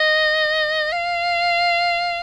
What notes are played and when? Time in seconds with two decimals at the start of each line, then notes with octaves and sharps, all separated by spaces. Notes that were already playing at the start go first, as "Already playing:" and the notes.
Already playing: D#5
0.92 F5